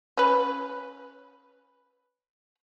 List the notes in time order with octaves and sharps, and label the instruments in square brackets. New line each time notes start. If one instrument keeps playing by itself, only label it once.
[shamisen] C#4 B4